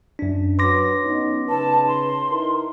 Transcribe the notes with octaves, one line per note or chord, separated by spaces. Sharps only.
F#2 D4
F#3 B4 C6 D6 A#6
B3 C#4 D#4
C#3 D#4 B4 A5
C6
D#4 E4 A#4